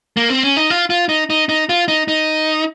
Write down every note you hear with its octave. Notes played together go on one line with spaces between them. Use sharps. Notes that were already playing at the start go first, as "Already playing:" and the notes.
A#3
C4
C#4
D#4
F4
F4
D#4
D#4
D#4
F4
D#4
D#4